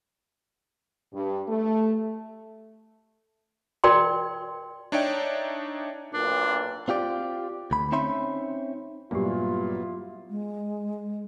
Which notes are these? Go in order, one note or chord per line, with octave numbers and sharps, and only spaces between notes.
G2
A3
A#4 D5 G5 C6
D4 D#4 C#5 D5 E5 G5
B1 A#2 D4
C4 F4 G4 D5
D2 B5
C4 C#4 D#4 E5 B5 C6
G2 A#2 F#3 B3 D4 E4 F4 G4
G#3